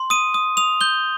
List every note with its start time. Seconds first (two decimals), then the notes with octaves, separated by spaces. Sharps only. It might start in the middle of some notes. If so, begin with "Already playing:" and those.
Already playing: C6
0.10 D#6 D#7
0.34 D#6
0.57 D#6 F7
0.81 G6 G7